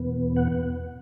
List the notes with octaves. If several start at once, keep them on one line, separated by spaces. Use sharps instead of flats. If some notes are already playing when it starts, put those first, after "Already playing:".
Already playing: E2 B2 B3
F#5